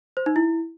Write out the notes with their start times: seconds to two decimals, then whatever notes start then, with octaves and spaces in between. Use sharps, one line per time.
0.17 C5
0.26 D#4
0.36 E4